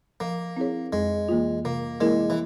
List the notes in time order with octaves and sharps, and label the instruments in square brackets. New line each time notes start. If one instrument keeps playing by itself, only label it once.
[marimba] F3 [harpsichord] A#3
[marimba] C4 E4 G#4 C#5
[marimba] F2 [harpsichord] G#3
[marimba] E3 A#3 F4
[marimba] C3 [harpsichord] A#3
[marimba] E3 A#3 E4 A#4 [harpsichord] G#3
[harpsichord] E3